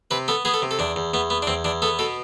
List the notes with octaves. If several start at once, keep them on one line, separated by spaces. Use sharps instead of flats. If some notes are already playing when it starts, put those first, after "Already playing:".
C3 B4
B3 A4
B3 G#4
A4
C3
A4
E2 D4
E2
E2 B3
B3
D4
E2 C4
E2 D4
B3 A4
B2 A4